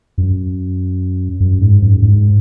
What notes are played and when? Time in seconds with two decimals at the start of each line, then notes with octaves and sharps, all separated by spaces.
0.18 F#2
1.40 F#2
1.61 G#2
1.82 F#2
2.02 G#2